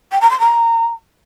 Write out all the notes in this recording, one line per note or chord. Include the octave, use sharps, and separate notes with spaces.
G5
A#5
C6
A#5